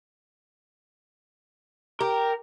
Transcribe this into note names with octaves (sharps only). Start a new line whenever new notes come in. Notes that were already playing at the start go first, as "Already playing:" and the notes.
G4 A#4